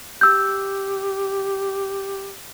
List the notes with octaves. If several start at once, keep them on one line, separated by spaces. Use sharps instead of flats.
G4 E6 G6